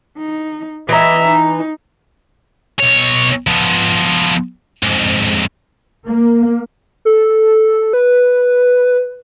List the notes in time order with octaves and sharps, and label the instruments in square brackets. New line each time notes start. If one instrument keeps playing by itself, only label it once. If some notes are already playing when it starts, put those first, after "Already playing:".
[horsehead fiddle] D#4
[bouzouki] E3 A#5 [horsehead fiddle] D#5 E5
[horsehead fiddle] D#4
[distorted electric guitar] B1 C#5
F3 B3
F2 G#2
[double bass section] A#3
[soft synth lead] A4
B4